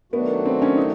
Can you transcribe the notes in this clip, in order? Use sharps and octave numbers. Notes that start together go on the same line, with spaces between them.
D#3 F#3 A3 B3 D4 F#4
C4
C#4
D#4